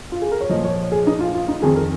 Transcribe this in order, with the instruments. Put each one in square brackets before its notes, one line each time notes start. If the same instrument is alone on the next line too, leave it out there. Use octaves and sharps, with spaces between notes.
[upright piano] F4
G#4
A#4
C#5
F3 D#5
A#2
C#5
G#4
D#4
F4
F4
D#4
F2 D#3 G#4
A#4